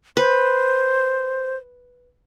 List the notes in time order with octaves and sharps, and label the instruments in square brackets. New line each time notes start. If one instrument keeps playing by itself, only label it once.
[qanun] B4 [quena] C5